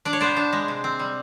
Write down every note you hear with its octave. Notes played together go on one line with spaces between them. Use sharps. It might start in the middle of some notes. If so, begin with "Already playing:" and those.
D4 D5
C#5
B3 C5 D5
D4
G#3
C3
C4
G3